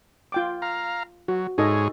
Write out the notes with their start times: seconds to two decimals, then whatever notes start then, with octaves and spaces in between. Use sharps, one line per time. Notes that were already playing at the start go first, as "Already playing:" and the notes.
0.32 F4 G5 D6
0.62 F5 A#5
1.28 F#3 F#4
1.58 G#2 D#4 G#4 A4 C#5 D#5